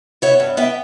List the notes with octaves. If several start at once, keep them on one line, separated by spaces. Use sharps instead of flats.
B3 C#5 E5
G2
B3 E5 G5